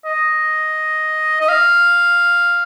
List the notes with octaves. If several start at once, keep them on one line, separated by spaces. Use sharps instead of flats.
D#5
D#5
F5